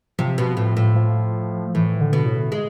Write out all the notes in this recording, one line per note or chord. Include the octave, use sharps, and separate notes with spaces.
C3 F3
B2
A2
A2
F3
A2 E3
D3
B2
A2
G#3